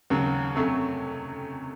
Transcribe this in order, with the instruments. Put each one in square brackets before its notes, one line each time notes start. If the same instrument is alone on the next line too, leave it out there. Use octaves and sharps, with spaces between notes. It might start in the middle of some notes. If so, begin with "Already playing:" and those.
[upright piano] D#2 C#3 F#3
F2 C3 F#3 A3 C#4